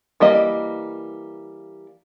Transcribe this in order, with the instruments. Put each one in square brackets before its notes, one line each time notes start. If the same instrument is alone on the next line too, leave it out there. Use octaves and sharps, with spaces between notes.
[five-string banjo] E3 G3 A#3 D#5